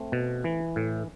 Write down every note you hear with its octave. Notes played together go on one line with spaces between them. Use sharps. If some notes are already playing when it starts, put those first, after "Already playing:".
Already playing: A3 C4
B2
E3
A2